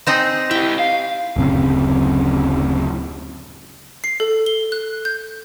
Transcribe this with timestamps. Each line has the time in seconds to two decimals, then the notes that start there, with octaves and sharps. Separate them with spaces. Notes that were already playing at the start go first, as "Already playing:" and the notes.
0.07 C4 D#4 G#4
0.51 E4 G4 G5
0.79 F5
1.36 D1 F#2 C#3 C4
4.04 C7
4.20 A4
4.46 G7
4.72 F#6
5.05 G6